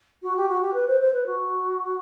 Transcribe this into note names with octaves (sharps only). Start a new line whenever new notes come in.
F#4
G4
F#4
G4
B4
C5
C5
B4
F#4